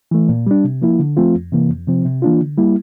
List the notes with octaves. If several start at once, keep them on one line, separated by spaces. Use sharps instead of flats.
E3 A3
A#2
G3 D4
C3
F3 A#3 E4
D3
F3 A3 C4 F4
F2
C3 E3 A#3
F2
C3 F3 C4
C3
E3 A#3 D4 F4
D3
G3 A#3 E4